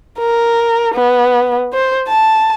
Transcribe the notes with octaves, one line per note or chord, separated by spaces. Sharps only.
A#4
B3
C5
A5